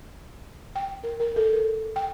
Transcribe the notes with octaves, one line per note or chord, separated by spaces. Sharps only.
G5
A#4
A#4
A4
A#4
G5